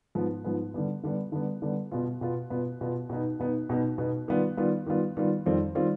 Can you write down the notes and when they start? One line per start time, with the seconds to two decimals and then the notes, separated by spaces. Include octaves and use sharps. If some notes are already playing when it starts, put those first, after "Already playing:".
0.15 G#2 F3 B3
0.44 G#2 F3 B3
0.74 D3 G3 B3
1.04 D3 G3 B3
1.32 D3 G3 B3
1.62 D3 G3 B3
1.91 B2 B3 F4
2.21 B2 B3 F4
2.50 B2 B3 F4
2.81 B2 B3 F4
3.09 B2 B3 D#4
3.40 B2 B3 D#4
3.69 B2 B3 D#4
3.98 B2 B3 D#4
4.28 D#3 G3 B3 F4
4.57 D#3 G3 B3 F4
4.86 D#3 G3 B3 F4
5.17 D#3 G3 B3 F4
5.46 F2 D#3 G3 C4 F4
5.75 D#3 G3 C4 F4